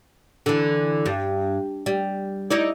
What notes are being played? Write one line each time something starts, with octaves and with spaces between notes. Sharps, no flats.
D3 E3
G2
G3
D#4 E4 D5